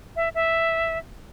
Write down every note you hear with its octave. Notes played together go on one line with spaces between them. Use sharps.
E5
E5